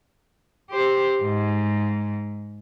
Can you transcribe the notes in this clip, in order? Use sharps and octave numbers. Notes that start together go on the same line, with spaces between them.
G4 C5
G#2